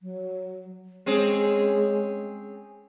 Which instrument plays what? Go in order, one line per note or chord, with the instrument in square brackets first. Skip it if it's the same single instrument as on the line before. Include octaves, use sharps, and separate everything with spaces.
[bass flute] F#3
[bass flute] G#3 [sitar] C4 C#4 G#4